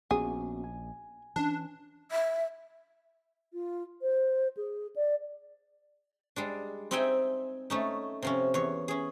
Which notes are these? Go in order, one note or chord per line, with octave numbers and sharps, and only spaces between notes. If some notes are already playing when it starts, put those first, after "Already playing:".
A#1 B3 C#4 F#4 G#4
G#5
E3 C#4 D4
E5
F4
C5
G#4
D5
G3 G#3 D4
C4 D#4 D#5 E5 G5 G#5
A3 C#4 D#4
C3 F3 C#4
E2 C#5
C#4 G#4